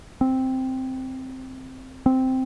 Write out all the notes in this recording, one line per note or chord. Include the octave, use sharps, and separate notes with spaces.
C4
C4